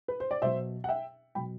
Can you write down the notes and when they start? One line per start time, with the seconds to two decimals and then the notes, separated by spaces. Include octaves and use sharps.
0.08 B4
0.20 C5
0.31 D5
0.42 B2 F#3 C5 E5
0.84 F#5
0.89 E5 G5
1.35 B2 F#3 G5 B5